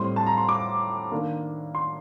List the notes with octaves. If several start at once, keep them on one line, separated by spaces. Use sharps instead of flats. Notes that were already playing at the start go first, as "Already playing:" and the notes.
Already playing: A2 G3 C4 C6
A5
A#5
C6
D6
D#3 A#3 D4
C6